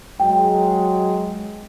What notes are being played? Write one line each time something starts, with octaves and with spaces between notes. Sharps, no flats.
F#3 G#3 G5